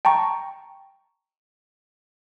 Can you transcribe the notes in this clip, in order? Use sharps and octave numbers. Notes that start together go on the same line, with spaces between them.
G5 A5 A#5 C#6